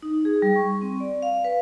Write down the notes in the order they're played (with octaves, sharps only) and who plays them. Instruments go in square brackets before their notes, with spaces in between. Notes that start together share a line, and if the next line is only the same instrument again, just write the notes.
[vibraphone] D#4
G#4
G3
C#6
C4
D5
F5
B4